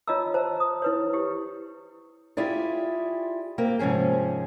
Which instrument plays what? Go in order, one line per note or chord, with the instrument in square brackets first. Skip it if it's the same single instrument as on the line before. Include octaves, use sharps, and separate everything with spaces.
[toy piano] F4 C#5 D#5 A5 A#5 E6
C5 D#5 A5 A#5
A#5 D#6
E4 B4 C#5
E4 G4
[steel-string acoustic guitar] E4 F4 G4 G#4 D5
A#3 C4 G4
G#2 C3 F3 C#4 G#4